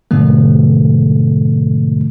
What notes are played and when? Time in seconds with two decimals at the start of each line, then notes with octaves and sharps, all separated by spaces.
0.11 G#2 B2 D3 F3 A3